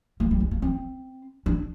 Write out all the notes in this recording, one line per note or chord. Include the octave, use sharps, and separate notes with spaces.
A#3
G3
G#3
A#3
C4
D4